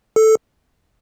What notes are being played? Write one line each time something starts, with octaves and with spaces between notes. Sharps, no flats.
A4